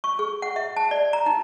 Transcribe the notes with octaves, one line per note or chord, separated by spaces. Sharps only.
C#6
G#4
F#5
E5
A5
D5
A#5
D#4